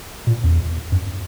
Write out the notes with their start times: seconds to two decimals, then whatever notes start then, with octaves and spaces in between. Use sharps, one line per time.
0.27 A#2
0.44 E2
0.92 F#2